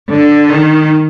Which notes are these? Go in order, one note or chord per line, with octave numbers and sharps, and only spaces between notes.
D3
D#3